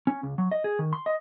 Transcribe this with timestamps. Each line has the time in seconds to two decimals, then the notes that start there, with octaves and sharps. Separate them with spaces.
0.07 C#4
0.23 C#2
0.38 F#3
0.52 D#5
0.64 G#4
0.79 D#3
0.93 C6
1.06 D#5